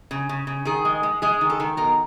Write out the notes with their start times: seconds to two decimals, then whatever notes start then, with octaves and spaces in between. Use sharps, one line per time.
0.11 C#3
0.29 C#3
0.47 C#3
0.65 D#3 G#4
0.85 G#3
1.03 G#3
1.22 G#3 G#4
1.41 D#3
1.50 A4
1.60 D#3
1.77 B2 A#4